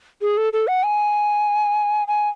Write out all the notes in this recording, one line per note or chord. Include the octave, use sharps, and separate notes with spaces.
G#4
A4
A4
F#5
G#5
G#5